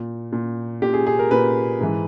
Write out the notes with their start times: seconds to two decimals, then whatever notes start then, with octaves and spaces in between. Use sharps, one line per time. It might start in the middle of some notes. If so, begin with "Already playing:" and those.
Already playing: A#2
0.33 A#2
0.82 A#2 G4
0.94 G#4
1.06 G#4
1.19 A#4
1.31 A#2 B4
1.80 G#2 E3